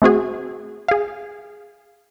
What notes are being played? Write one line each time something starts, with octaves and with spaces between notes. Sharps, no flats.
A3 C4 F#4 G#4
G#4 F5